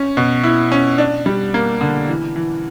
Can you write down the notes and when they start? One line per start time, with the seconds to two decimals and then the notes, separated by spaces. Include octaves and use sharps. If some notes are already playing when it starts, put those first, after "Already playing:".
Already playing: C#4
0.17 B2
0.44 E4
0.72 C#4
0.98 D4
1.26 G3
1.54 A#3
1.81 D3
2.08 E3
2.36 E3